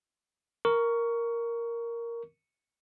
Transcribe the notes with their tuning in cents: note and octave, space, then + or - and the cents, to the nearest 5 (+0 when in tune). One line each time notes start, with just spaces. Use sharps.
A#4 +0 C#6 +20